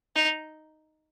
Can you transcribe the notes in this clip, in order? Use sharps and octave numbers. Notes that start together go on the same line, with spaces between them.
D#4